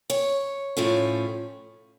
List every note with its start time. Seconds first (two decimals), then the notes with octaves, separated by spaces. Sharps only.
0.10 C#5
0.77 A2 F3 A3 C#4